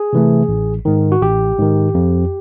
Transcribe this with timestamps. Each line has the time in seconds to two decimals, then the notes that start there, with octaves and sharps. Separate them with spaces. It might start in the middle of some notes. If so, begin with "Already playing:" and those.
Already playing: G#4
0.13 C3 E3 A3
0.49 A1
0.85 G#2 D#3
1.12 F#4
1.22 A1 G4
1.58 G#2 D#3
1.94 F2